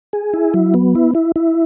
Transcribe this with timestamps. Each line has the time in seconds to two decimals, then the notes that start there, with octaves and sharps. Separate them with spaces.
0.13 G#4
0.34 E4
0.54 F#3
0.74 B3
0.95 E4
1.15 E4
1.36 E4